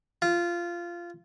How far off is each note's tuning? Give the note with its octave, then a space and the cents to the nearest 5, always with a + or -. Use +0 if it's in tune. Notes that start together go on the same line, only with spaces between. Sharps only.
F4 -15